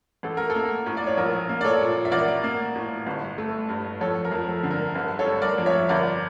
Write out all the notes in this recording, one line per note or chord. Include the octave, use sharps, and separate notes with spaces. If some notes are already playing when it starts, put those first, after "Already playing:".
A1 A4
A#4
A4
A#3
A2
D5
C#5
A#1 A#4
A#3
D5
A4 C#5
A#2
E5
A1 A#4 D5
A#3
A2
G1
A3
G2
F2 A4 C#5
A#4
F2
A4
D3
A#4
G1 A#4
A4 C#5
G3
A#4 D5
F2
C#5 E5
G1 A#4 D5